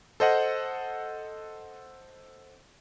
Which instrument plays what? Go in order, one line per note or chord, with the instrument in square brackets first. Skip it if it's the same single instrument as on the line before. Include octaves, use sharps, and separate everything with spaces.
[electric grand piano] A4 C5 D#5 F#5